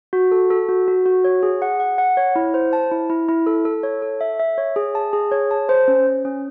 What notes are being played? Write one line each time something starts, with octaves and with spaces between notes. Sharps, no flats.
F#4
A4
A4
F#4
F#4
F#4
C#5
G#4
F#5
F#5
F#5
C#5
E4
C5
A5
E4
E4
E4
A4
A4
C#5
A4
E5
E5
C#5
G#4
A5
G#4
C#5
A5
C5
C#4
C#4
C#4